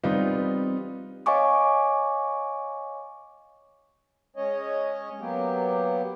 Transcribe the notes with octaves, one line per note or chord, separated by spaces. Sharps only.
G3 B3 C4 D#4 F4
C#5 D#5 F5 G#5 C#6 D6
G#3 C#4 C#5 D#5
F#3 A#3 B3 G4